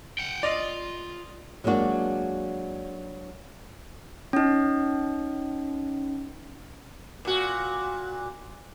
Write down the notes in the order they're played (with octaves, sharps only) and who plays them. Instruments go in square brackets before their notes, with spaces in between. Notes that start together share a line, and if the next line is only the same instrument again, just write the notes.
[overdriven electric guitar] F#5 G5
[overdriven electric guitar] F4 [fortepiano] D5 D#5
[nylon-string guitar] F#3 G#3 A#3 D4 F#4
[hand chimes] C#4 D#4
[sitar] A#2 F#4